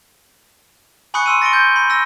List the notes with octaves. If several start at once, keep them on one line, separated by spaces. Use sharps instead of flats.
G#5 B5 C#6 D#6 F#6 C#7
C6 E6 D#7
A6 A#6 C#7 D7 G7
G6
B5
E6 A#6